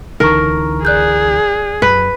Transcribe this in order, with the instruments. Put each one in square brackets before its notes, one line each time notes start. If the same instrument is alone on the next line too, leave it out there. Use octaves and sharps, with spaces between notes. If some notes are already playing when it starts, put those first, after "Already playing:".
[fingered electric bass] C#2 D3 E3 [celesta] D#4 C#6 [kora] A#4
[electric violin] G#4 [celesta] D5 F#6 G6
[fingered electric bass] F#2 [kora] B4